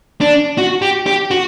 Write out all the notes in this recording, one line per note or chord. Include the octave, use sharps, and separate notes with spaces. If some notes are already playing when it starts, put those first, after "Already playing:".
D4
F#4
G4
G4
F#4